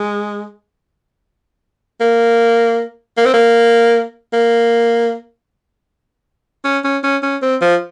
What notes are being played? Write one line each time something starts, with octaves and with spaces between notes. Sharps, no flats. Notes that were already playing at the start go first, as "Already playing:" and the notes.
Already playing: G#3
A#3
A#3
C4
A#3
A#3
C#4
C#4
C#4
C#4
C4
F3